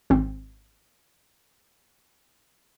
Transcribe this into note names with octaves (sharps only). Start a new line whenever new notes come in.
G#1 C4